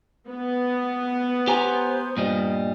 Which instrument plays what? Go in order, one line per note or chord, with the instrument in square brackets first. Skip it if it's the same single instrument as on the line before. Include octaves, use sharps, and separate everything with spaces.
[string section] B3
[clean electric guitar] G4 G#5 A#5 [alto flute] C5
[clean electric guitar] G2 A#2 G3 [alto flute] D#5